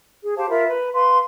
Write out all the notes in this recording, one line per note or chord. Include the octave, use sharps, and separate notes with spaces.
G#4
G4 C5 F5 A5
F4 A#4 E5 B5
B4 A#5
B4 F5 C6